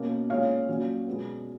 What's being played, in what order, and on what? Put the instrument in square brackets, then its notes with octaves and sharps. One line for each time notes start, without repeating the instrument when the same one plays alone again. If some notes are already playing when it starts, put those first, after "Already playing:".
Already playing: [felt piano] B2 A#3 C#4
A#2 G#3 C#4 C#5 F5
A#2 F#3 C#4
B2 G#3 B3